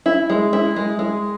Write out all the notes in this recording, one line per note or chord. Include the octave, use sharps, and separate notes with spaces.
E4
G#3
E4
G#3
G#3